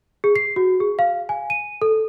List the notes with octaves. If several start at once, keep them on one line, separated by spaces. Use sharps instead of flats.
G#4
C7
F#4
G#4
F5
G#5
D#7
A4